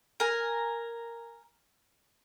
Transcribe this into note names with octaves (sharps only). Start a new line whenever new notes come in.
A#4 G#5